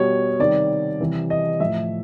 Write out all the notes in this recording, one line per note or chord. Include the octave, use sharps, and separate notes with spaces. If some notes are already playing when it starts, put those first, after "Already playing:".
Already playing: B2 G3 C#5
C3 D#3 G3 D5
C3 E3 G3
D#5
A2 F3 E5